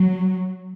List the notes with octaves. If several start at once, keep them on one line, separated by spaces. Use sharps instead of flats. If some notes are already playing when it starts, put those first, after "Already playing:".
Already playing: F#3